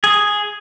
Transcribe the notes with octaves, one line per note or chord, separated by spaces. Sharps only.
G#4